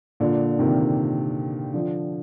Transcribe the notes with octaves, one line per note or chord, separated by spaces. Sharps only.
A#2 D3
C3 D#3
D3 F3